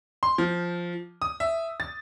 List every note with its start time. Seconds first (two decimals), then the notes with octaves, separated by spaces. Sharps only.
0.23 C6
0.38 F3
1.22 D#6
1.40 E5
1.80 A6